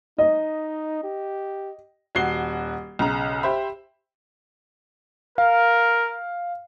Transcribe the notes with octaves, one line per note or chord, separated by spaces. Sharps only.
D#4 D#5
G4
D#1 F#4 C7 G7
B1 C#3 A#5
G4 C5 E5 B5
A#4 F5